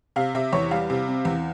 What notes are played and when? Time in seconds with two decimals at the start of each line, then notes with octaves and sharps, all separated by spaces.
0.16 C3 F5
0.35 C3 E5
0.53 E2 C#5
0.71 G3 F5
0.90 C3
1.08 C4
1.25 E2